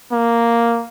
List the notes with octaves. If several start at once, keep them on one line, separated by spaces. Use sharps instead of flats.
A#3